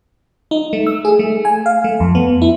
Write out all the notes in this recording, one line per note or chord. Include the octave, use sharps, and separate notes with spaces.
D#4
A3
E6
G#4
A3
G#5
F5
A3
F2
B3
E4